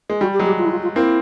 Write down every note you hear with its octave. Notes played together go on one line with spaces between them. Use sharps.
G#3
G3 F#4
G4
F#3 G#3
G4
F4
E4
F4
F4
A#3 C4 E4